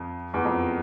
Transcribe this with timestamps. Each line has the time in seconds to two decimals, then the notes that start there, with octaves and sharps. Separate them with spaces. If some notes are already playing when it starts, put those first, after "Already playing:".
Already playing: F2
0.34 E2
0.45 F2